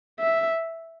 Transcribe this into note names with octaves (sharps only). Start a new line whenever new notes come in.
E5